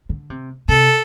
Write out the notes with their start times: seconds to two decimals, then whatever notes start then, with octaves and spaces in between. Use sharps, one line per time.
0.09 D3
0.30 C3
0.68 C3 A4